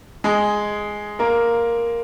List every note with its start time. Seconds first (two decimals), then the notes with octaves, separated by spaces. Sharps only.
0.24 G#3 G#4
1.19 A#3 A#4